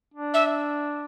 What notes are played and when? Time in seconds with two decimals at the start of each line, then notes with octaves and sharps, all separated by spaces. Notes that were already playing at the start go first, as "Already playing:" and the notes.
0.14 D4
0.34 E5